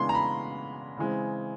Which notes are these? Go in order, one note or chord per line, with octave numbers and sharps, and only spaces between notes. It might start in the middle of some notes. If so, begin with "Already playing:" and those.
Already playing: C#3 E3 G#3 B3 D4 C6
A#5
B5
C#3 E3 G#3 C4